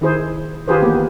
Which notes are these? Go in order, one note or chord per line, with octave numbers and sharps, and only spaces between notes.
D#3 E4 G#4 C5
D#3 F4 G4 G#4 B4 C5
E3 A#3 B3 G4